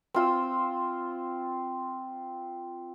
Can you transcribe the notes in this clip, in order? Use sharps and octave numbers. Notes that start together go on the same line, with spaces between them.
C4 F4 E6